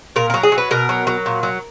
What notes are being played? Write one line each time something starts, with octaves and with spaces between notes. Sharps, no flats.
A#2 A#4
F#3 A#4
G#4
F#3
B4
B2 A#4
F#3
F#3
A#2
F#3